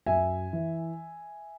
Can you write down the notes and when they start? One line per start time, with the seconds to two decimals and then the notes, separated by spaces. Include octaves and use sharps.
0.06 F#2 E5 G#5
0.53 E3